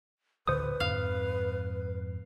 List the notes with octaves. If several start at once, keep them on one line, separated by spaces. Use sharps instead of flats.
A1 D2 D3 B4 C5 D#6
F2 G#2 F5